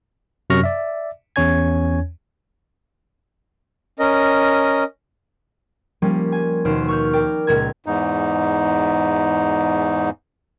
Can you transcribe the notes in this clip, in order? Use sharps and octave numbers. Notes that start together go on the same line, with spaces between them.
F#2 C3 F#3 C#6 F6 A#6
D5 E5
E2 C#4 C#5 G#5 G#6
C#4 A#4 D#5
F3 G3 A#3 C#4
G#5
D#2 B2 C5 F6 D7 E7
C#6 F6 G6
A#4 D5 G5
C#2 A#2 A#4 G#6
E2 G#2 D#4